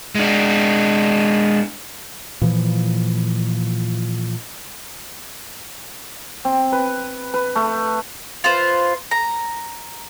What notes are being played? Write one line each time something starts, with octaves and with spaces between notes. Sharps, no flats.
G#3 D4
A#2 E3 F3
C4
B4
B4
A3
F4 B4 C5
A#5